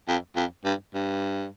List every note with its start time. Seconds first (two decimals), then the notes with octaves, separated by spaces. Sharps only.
0.08 F2
0.36 F2
0.65 G2
0.94 G2